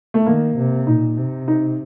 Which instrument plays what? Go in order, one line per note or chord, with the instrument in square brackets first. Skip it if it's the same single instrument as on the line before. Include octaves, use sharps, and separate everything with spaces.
[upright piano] A3
[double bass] D#3 [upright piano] A#3
[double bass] C3
[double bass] A#2 [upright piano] D#4
[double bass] C3
[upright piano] D#4